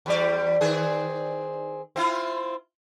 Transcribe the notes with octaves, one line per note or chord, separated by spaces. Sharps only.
E2 G3 D5
D#3 C4 G#4
C4 E4 F4